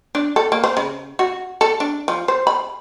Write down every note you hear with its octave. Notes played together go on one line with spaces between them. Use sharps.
D4
A4
A#3
C5
C#3
F#4
A4
D4
F3
C5
B5